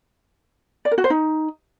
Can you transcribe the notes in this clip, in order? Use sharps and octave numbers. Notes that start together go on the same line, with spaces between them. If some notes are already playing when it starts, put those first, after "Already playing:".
D5
A#4
F#4
C5
D#4